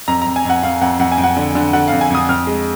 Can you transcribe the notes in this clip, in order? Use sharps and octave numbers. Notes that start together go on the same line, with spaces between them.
F2 A#5
F2 A#5
G#5
F2 F#5
F2 F5
F2 F#5
F2 F#5
G#5
F2
F#5
D3
D3
D3 F#5
F2 F5
G#5
F2 D#6
F2 F6
G#3